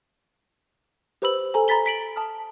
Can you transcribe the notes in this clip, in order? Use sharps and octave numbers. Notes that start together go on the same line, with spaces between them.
G4 B4 C5 B5 E6 F#7
A4 C5 G#5 A#5
A#5 B5 A6 B6 G7
B6 D7 F#7
A5 D#6 F6